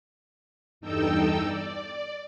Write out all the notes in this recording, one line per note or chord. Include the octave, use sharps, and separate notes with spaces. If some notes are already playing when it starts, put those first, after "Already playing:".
E2 G2 D#4 A4 G5 E6
D5